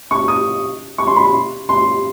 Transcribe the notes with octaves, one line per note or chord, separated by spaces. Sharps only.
C#6
D#6
C#6
C6
B5
C6
C6